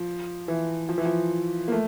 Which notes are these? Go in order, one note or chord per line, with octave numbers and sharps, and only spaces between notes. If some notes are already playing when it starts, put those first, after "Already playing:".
Already playing: F3
E3
F3
E3
F3
A#3
A3